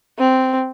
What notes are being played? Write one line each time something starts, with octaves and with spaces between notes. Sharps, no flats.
C4